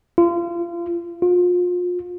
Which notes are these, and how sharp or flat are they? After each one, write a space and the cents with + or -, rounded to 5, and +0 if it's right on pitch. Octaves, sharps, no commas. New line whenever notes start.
F4 -30
F4 +35